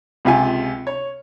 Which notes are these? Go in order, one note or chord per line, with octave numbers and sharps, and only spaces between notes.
C#2 C3 F4 G#5
C#5